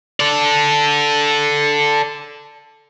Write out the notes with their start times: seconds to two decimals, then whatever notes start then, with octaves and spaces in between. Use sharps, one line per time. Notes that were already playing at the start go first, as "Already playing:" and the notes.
0.20 A4 D5